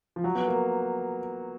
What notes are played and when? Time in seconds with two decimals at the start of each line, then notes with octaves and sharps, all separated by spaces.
0.16 F3
0.24 F#3
0.35 B3
0.47 A#3